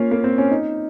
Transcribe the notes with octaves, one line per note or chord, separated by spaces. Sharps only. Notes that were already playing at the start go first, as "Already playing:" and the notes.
Already playing: A#3 C#4 F4
A#3
C4
C#4
D#4